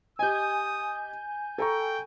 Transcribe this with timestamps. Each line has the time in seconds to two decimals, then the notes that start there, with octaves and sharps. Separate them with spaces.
0.19 G4 D#5 G#5 D#6 G6
1.58 A4 G5 A#5 C#6